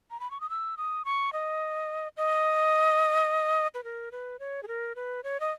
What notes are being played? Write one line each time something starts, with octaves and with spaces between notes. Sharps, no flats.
A#5
B5
C#6
D#6
E6
D#6
C#6
D#5
D#5
B4
A#4
B4
C#5
G#4
A#4
B4
C#5
D#5